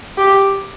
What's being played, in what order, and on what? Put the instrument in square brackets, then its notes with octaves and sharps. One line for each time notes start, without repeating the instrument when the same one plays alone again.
[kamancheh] G4